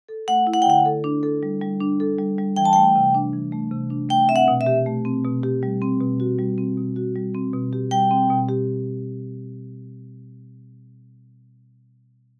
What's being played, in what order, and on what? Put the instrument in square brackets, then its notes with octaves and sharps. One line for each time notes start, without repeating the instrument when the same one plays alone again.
[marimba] A4
[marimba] A3 [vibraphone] F#5
[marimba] E4
[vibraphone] F#5
G5
[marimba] D3 [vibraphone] F#5
[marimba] A4
D4
A4
G3
G3
D4
A4
G3
G3
[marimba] E3 [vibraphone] G5
[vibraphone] A5
[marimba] A3 [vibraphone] G5
[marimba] C3
D4
E3
A3
C3
D4
[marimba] A3 [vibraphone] G5
[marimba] C4 [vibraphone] E5
[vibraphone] F#5
[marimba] B2
[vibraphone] E5
[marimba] G4
A3
C4
B2
G4
G3
C4
B2
F#4
G3
C4
B2
F#4
G3
C4
B2
G4
[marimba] G3 [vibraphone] G5
[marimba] C4
B2
G4